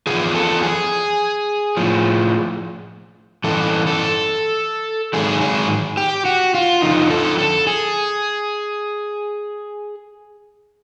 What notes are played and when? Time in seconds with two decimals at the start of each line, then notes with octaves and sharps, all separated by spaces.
0.07 C#3 F3 G#4
0.11 E2
0.35 A4
0.63 G#4
1.77 A2 F3
3.44 G2 E3 A4
3.87 A4
5.13 G#2 D#3 F#3 G#4
5.41 G#4
5.97 G4
6.25 F#4
6.55 F4
6.82 F2 D3 F3 D#4
7.11 A4
7.39 A4
7.67 G#4